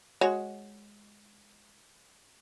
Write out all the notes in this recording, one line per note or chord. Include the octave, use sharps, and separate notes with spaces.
G#3 F#4 C#5